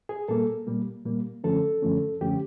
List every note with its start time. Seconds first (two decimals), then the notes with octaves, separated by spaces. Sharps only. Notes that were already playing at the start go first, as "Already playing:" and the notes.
0.09 G#4
0.28 A#2 G3 A#3 A4
0.67 A#2 G3 A#3
1.05 A#2 G3 A#3
1.44 F#2 D3 F3 A3 C#4 A4
1.82 F#2 D3 F3 A3 C#4
2.21 F#2 D3 F3 A3 C#4 G4